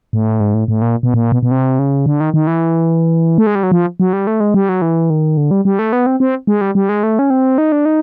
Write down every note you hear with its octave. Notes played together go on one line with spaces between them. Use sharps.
A2
G#2
A2
A2
A#2
B2
A#2
B2
B2
C3
C#3
D3
D#3
D#3
E3
A3
G#3
G3
F#3
F3
F#3
G3
A3
G#3
G3
F#3
E3
D#3
D3
G3
G3
A3
B3
C4
C4
G#3
G3
G3
G#3
A3
C#4
C4
D#4
D4
D#4